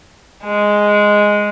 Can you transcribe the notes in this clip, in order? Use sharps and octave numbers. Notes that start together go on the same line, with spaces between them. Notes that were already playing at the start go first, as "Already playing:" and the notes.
G#3